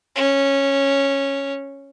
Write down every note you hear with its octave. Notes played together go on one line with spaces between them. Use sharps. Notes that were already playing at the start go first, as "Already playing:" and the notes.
C#4